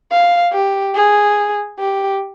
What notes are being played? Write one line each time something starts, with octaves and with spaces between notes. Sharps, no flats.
F5
G4
G#4
G4